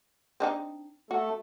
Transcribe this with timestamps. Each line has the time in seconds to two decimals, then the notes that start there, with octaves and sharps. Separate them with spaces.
0.40 C4 D4 D#4
1.11 A3 F#4 A4